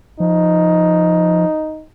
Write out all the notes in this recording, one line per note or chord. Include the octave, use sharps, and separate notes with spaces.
F3 D#4